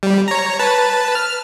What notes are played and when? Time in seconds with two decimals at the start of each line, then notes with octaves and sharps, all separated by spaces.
0.03 G3
0.28 C#5 A#5
0.59 B4 A5
1.15 F6